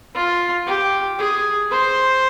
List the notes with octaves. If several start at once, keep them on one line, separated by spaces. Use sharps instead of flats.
F4
G4
G#4
C5